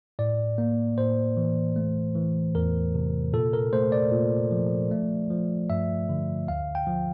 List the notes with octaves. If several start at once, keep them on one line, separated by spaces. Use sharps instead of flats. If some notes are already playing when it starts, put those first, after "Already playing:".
A2 D5
A#3
A2 C5
E3
A3
E3
E2 A#4
C3
A#2 A4
A#4
A3 C5
D5
A#2
F3
A3
F3
G2 E5
D3
D2 F5
G5
F3